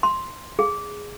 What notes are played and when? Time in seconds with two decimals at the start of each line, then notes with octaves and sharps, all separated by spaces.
0.03 C6
0.59 G#4